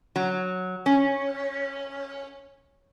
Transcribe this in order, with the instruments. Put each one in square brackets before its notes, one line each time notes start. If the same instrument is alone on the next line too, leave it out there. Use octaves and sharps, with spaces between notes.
[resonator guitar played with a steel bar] F#3
C#4